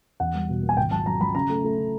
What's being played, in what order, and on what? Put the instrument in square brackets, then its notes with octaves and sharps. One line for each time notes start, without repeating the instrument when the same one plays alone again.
[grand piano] E2 F#5
G3
B2
A#3
G#5
G#1 G5
F#3 A5
F#3 A#5
F#3 B5
C#3 A#5
A3
A3
C#3